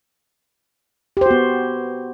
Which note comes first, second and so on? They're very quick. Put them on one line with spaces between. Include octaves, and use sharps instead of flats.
G4 C5 F#4 B3